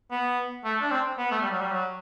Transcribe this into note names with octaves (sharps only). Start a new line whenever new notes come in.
B3
A3
D4
C4
B3
A3
G3
F#3
G3
F#3